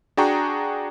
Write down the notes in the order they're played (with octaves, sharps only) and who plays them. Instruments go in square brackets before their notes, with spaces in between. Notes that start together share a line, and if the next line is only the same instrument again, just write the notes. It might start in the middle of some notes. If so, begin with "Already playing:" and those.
[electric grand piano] D4 F#4 G#4 G5 A#5 C#6